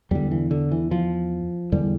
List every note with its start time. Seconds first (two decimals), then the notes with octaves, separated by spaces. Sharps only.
0.11 E2 D3 G3
0.31 E3
0.51 D3
0.72 E3
0.91 F3
1.72 E2 D3 G3